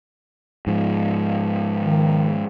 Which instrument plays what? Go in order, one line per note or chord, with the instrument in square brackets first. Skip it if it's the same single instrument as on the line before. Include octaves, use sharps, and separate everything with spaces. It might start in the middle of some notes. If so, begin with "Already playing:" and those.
[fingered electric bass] G#2 F3
[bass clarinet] D#3